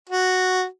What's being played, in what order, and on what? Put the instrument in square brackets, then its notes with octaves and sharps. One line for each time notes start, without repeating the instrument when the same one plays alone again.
[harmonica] F#4